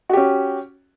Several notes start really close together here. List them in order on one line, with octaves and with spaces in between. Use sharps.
F#4 G4 C#4